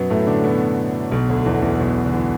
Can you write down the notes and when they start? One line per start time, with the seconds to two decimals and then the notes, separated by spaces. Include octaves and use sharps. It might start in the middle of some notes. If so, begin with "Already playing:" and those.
Already playing: F#2 B2 F#3 B3
0.10 A2 A3
0.27 D3 D4
0.44 B2 B3
1.11 B1 B2
1.29 D2 D3
1.45 E2 E3
1.62 E2 E3
1.79 B1 B2
2.05 D3
2.14 E3